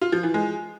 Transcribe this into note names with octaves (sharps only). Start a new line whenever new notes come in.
F4
F3
E3
G#3